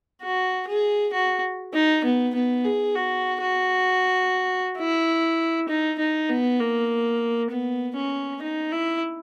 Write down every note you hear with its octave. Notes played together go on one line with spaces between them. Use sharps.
F#4
G#4
F#4
D#4
B3
B3
G#4
F#4
F#4
E4
D#4
D#4
B3
A#3
B3
C#4
D#4
E4